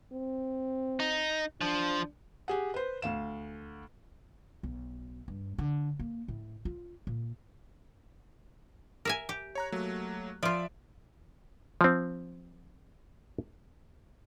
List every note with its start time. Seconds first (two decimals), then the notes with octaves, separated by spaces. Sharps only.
0.12 C4
1.00 D#4
1.61 F3 D4
2.48 G4 G#4 F#5
2.74 B4 C5
3.02 D2 F5 E7
4.63 B1
5.28 G2
5.58 D3
5.99 A#3
6.28 A2
6.65 F4
7.07 A#2
9.05 A#4 E5 G#5
9.29 G4
9.55 C#5 A#5 F#6
9.72 F#3 A3 A#3
10.43 F3 F4 D5 E5 D7
11.81 F3 C4